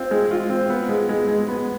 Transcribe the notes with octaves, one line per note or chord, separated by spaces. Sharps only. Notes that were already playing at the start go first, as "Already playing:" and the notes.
Already playing: C4 F4
G#3
F4
C4
B3
G#3
G#3
G#3
B3